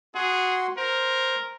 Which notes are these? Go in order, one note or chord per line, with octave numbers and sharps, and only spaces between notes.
F#4 G#4 F#5 C6
A#4 C5